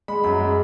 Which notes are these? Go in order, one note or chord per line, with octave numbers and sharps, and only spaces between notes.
G#3 B5
F#2 B5
G#3